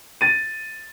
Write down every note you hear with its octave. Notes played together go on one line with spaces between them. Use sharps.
A6 D#7